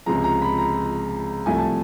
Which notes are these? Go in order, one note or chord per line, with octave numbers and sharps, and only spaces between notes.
C#2 C3 F3 G#3 A#5
A#5
B5
A#5
C2 C3 F3 A3 G#5
A5